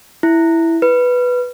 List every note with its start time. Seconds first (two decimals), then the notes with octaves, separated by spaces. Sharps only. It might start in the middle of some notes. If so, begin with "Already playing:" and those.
0.23 E4
0.82 B4